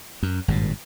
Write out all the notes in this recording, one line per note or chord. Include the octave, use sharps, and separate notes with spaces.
F#2
G#1 G2 A#2